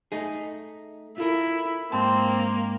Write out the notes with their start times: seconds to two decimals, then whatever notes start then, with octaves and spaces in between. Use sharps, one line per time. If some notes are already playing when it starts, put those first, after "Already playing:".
0.12 A3 D#4 G#4
1.18 E4 F4 A4 A#4
1.92 G#2 A#3 C4 A5